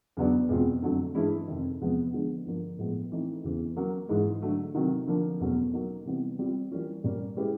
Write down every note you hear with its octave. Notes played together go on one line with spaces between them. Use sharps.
E2 C#3 F#3 B3 D4
E2 B2 G#3 C4 F4
F2 D3 F#3 A3
G2 E3 G#3 C#4 E4
F2 C3 D#3
E2 C3 F3 G#3 B3
D3 F3 G#3 B3
G2 D3 F3 A#3
A2 F3 G#3 B3
E3 A3 C4 D#4
E2 C#3 E3
F#3 A#3 C#4
G#2 E3 G#3
D3 F#3 A3
C3 D#3 F#3
D3 F3 A#3
E2 B2 F#3 A3 C#4
F#3 A#3 D#4
C3 E3 G3 B3
G3 C4 F4
E3 G3 A#3 C#4 F4
A#2 G3 A#3 C#4
G#3 C#4 E4 G4 B4